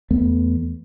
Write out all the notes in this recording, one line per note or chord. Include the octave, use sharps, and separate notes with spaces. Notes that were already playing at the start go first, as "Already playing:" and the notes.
E2 A3 B3